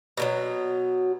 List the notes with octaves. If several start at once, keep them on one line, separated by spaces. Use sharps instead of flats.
B2 D3 F#3